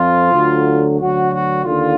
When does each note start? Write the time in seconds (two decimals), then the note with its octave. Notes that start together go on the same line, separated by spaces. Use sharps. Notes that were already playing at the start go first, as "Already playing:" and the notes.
Already playing: F2 F3 F4
0.33 D2 D3 F#3
0.99 D2 D3 F#3 F#4
1.33 F#4
1.65 D#2 D3 F4